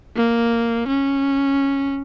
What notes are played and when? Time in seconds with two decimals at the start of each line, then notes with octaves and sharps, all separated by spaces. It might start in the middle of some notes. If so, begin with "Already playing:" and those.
0.16 A#3
0.88 C#4